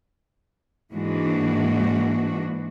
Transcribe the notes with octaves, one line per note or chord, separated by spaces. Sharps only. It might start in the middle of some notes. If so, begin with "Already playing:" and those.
G#2 E3 G#3 A#3 D4 F#4